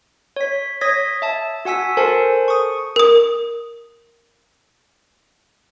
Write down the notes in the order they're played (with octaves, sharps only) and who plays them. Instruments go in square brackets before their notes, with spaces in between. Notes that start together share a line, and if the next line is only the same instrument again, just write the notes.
[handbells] C#5 B6
C#5 D#6 G#6 A#6 B6
E5 A5
F#4 F#5 G#5 E6 B6
A4 A#4 C5 G#5 A5
C#6 D#6
[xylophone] A#4 D#6